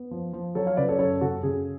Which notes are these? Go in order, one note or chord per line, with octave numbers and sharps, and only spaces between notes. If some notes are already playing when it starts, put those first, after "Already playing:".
Already playing: B3
F3
F3
F#3 A4 C#5
C#5 F5
C#3 B4 D5
A4 C#5
F#2 A4 C#5
C#3 F#4 A4
C#3 G#4